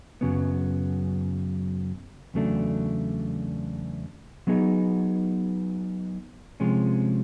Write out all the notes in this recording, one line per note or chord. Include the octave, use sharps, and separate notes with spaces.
F#2 C#3 F#3 B3
E2 C#3 F#3 A3 D4
F#3 B3 D#4 G#4
C3 F3 G#3 C#4